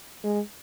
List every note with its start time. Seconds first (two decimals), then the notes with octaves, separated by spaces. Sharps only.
0.24 G#3